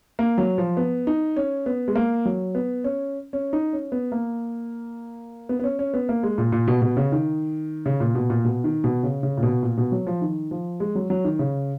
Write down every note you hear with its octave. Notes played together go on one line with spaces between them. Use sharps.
A#3
F#3
F3
B3
D#4
C#4
B3
G#3
A#3
F#3
B3
C#4
C#4
D#4
C#4
B3
A#3
B3
B3
C#4
C#4
B3
A#3
G#3
A#2
A#2
B2
B2
C#3
D#3
C#3
A#2
B2
A#2
B2
D#3
B2
C#3
C#3
A#2
B2
A#2
B2
F#3
F3
D#3
F3
G#3
F#3
F#3
D#3
C#3